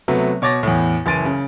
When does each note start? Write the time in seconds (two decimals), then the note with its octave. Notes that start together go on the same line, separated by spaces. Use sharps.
0.08 C3 F#3 A3 B3
0.42 B2 C#5 D6 A6 A#6
0.63 E2 A2
1.06 F#1 E3 C6 A6 D7 D#7
1.25 C#3